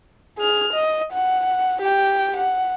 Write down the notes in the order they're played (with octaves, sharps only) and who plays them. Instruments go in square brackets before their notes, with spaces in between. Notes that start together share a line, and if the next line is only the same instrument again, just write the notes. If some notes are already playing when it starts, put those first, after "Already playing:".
[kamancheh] G#4 F6
D#5
F#5
G4 G5
F#5